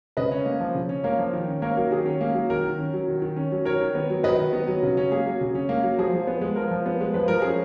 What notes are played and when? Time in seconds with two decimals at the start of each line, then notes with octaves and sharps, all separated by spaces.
0.17 C#3 B4 D#5
0.31 C#4
0.46 A#3
0.60 F3
0.75 C#3
0.89 C#4
1.04 A#3 A#4 C#5
1.18 F3
1.33 D#3
1.48 C#4
1.62 A#3 A#4 C#5
1.77 F#3 A#4
1.91 D#3 G#4
2.05 C#4
2.21 A#3
2.34 F#3
2.50 D#3 A#4
2.64 D#3
2.79 C#4
2.93 F#3
3.08 D#3
3.22 D#3
3.36 C#4
3.52 F#3
3.65 D#3 A#4 C#5
3.80 D#3
3.95 B3
4.10 F#3
4.23 D#3 B4 D#5
4.38 D#3
4.53 B3
4.67 F#3
4.83 C#3
4.97 C#4
5.11 A#3 G#4
5.26 F#3
5.41 C#3
5.55 C#4
5.69 A#3
5.83 F#3
5.98 F3 G#4
6.14 F3
6.27 B3
6.41 G#3
6.56 F3 A#4
6.71 F3
6.86 B3
7.01 G#3
7.14 F3 B4
7.28 F3 A#4
7.42 C#4 G#4